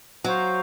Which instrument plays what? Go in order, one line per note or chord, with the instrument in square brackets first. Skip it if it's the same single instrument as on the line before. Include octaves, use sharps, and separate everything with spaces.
[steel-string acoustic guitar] F#3 [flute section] C5 F5 A#5 C#6